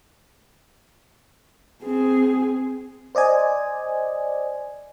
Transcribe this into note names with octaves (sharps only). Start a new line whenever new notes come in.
C4 G#4
C5 D5 D#5 G#5